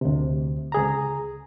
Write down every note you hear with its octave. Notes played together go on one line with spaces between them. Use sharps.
D2 C3
C#2 G#4 A#5